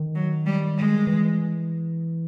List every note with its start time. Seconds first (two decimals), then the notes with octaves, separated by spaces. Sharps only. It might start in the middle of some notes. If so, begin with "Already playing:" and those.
Already playing: D#3
0.15 F#3
0.46 G3
0.77 G#3
1.07 E3